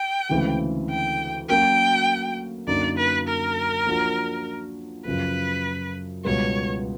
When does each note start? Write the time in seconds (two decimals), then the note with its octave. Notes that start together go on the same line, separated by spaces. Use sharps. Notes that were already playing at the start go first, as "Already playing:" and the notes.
Already playing: G5
0.30 D2 C#3 E3 G#3 C4
0.90 G5
1.48 F#3 A#3 C#4 F#4 A#4 G5
2.67 F#2 D3 F#3 A#3 D#4 D5
2.97 B4
3.28 A#4
3.87 F3 A#3 D4 F#4
5.05 F#2 C#3 F3 B4
6.25 C#2 B2 G3 B3 C#5